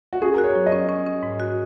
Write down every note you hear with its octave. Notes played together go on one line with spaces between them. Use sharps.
F#4
C#4 G#4
F#4 A#4
C#5
F#3
D#5
C#4
C#4
C#4
G#2
F#4